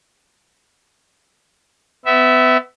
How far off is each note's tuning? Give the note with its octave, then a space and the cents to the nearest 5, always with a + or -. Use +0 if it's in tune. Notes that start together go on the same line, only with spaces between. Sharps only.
B3 +35 E5 -5